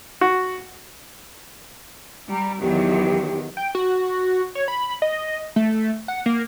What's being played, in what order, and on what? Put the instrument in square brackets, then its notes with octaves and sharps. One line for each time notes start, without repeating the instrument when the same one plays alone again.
[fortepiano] F#4
[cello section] G3 [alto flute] A#5
[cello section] E2 D#3 F#3 [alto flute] G4
[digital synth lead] G5
F#4
C#5
B5
D#5
A3
F#5
A#3